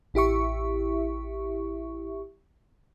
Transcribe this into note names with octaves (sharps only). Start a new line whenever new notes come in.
A1 E4 G4 E5 C#6